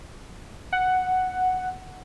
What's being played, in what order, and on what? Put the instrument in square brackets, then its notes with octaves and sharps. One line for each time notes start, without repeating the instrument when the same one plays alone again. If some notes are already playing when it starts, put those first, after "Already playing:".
[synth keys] F#5